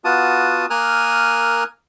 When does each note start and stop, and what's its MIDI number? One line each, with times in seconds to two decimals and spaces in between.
0.04 0.66 59
0.04 0.66 65
0.04 0.66 66
0.04 0.66 81
0.04 0.66 87
0.70 1.64 58
0.70 1.64 70
0.70 1.64 80
0.70 1.64 87
0.70 1.64 89
0.70 1.64 90